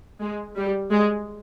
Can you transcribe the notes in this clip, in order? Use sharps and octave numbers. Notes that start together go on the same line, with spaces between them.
G#3
G3
G#3